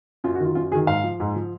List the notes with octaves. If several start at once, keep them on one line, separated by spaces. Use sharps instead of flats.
F#2 F4
F#4
D#3 F#3 F4
F#2 F4
D#3 F#3 G#4
G#2 F5
F3
G#2
F3